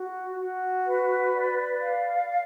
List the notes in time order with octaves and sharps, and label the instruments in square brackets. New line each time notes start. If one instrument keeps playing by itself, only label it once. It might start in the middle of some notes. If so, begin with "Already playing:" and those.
Already playing: [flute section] F#4
F#4
B4
D5
F5